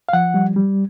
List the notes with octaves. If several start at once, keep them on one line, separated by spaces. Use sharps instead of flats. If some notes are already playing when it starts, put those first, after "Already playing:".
F5
F3 F#5
G3
G3